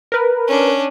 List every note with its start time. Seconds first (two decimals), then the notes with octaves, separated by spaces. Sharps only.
0.12 A#4 B4
0.48 C#4 D4